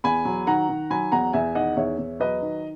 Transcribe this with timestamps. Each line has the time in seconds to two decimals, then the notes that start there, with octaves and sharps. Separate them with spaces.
0.04 E2 G#5 B5
0.25 F#3
0.47 D#3 F#5 A#5
0.69 D#3
0.90 F#3 G#5 B5
1.12 E2 F#5 A#5
1.33 E2 E5 G#5
1.55 D#3 D#5 F#5
1.76 E2 C#5 E5
1.98 E2
2.20 F#3 B4 D#5
2.42 D#3